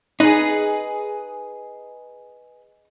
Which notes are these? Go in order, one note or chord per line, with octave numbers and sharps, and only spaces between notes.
D#4 G#4 B4